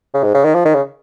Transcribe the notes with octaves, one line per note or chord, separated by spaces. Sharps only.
C#3
G#2
C#3
D#3
F3
D#3
C#3